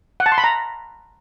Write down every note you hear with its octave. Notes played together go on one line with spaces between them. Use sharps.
F#5
A5
C6
B5
A#5